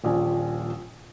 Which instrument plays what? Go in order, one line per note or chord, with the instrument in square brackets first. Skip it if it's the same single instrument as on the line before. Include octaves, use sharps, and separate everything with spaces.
[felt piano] D#1 A#1 F3 G#5